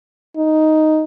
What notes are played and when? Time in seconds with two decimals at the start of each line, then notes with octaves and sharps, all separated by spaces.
0.37 D#4